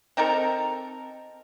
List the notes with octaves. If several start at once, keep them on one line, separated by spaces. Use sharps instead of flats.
C4 D#4 A4 A#4